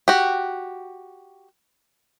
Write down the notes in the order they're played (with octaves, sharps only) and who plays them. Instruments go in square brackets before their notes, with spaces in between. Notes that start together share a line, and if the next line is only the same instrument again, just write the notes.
[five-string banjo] F#4 G4